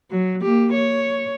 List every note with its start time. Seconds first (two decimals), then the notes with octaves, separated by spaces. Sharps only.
0.11 F#3
0.42 A#3 G4
0.73 C#5